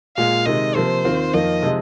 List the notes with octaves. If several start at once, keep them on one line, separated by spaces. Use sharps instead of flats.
A#2 G#3 F4 F5
C3 D#3 G#3 D#5
C3 F3 A#3 C5
D#2 D#3 C4 F4
F2 D#3 A#3 F4 D#5
C3 F3 G#3 D#4